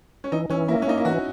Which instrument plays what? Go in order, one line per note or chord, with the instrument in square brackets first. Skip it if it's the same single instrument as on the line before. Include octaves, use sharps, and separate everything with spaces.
[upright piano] C#4
[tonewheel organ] E3 [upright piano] D#4
[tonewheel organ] E3 [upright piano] C#4
[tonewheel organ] A#3 [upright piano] E4
[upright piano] C#4
[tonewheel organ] A#3 [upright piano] D#4
[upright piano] E4
[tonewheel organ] E3 [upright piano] F#4